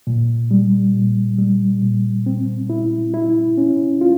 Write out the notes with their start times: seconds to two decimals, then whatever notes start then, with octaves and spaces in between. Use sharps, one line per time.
0.07 A#2
0.51 G3
0.94 A#2
1.38 G3
1.82 A#2
2.26 C4
2.70 E4
3.14 E4
3.58 C#4
4.01 F4